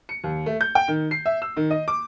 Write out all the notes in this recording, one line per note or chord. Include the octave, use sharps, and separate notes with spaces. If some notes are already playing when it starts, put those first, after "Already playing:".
C#7
D#2
A3
G6
G5
D#3
C7
E5
E6
D#3
D#5
D6